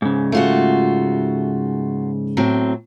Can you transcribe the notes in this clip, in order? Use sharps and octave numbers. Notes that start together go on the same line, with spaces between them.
G#2 C#3
A3 F4 F#4
A2 F#3 C4